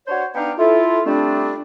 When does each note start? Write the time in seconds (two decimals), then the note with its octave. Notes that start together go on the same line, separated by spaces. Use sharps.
0.07 D4 F#4 C5 C#5
0.35 B3 D4 D#4 F5 G5 A#5
0.58 E4 F4 A4
1.06 D3 G3 A3 C4 D4